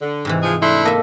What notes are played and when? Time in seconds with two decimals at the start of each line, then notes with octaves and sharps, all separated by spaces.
0.01 D3
0.25 G#2 C3 E3
0.43 F3 G#3 G#4
0.62 A3 D4 E4 C6
0.85 A#3 A4 D#5 E5